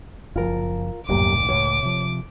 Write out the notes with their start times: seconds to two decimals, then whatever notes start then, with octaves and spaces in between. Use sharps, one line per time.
0.36 F#1 F3 F4 A#4
1.09 D#1 C2 F#2 A2 A#3 G4 D6
1.49 C#2 A2 C#5
1.83 C3 F3